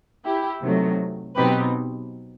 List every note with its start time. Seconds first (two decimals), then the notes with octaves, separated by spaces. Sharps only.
0.25 E4 G4
0.62 C3 D#3 F#3 A3
1.36 B2 F#3 C4 D#4 G4 B4